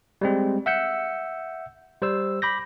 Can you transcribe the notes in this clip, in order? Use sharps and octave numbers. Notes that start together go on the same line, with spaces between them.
G3 G#3 C4
E5 F#5 E6 G6 C#7
G3 C5 E6
B5 D6 G6 A#6